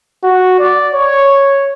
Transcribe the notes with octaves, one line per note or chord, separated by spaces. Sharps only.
F#4
D5
C#5